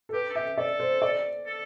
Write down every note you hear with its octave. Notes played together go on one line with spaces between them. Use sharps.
A4
G4 B4
A4
G4 E5
A4 D5
C5
D5
A4